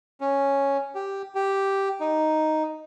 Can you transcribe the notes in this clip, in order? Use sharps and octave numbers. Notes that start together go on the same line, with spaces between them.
C#4
G4
G4
D#4